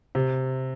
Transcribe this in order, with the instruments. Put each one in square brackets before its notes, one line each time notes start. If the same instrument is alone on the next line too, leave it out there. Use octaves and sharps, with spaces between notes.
[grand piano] C3